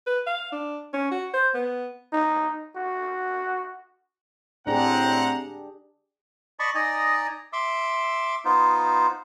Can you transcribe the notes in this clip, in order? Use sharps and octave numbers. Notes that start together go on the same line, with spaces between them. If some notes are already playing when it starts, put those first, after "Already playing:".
B4
F5
D4
C#4
F#4
C5
B3
D#4
F#4
A2 C4 D4 G4 G#4 F#5 A#5
D5 D#5 A5 B5 C#6
D#4 D5 D#5 G#5 A#5
E5 C6 D6 E6
B3 D#4 F4 C5